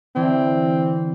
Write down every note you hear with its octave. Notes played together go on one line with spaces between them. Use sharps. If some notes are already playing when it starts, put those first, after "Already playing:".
D3 E3 C4